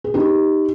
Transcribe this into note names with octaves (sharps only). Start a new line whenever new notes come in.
G#4
D#4 G4